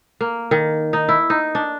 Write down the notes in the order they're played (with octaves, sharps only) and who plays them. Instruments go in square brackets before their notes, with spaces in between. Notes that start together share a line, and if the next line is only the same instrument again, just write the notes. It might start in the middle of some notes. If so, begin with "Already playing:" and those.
[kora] A#3
D#3
D#4
E4
D#4
D4